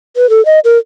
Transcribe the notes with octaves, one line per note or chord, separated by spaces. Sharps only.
B4
A4
D#5
A#4